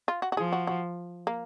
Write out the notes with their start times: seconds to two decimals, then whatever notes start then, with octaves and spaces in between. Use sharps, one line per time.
0.08 F4
0.22 F#4
0.32 F#4
0.37 F3 G#4
0.52 F#4
0.67 F#4
1.27 A#3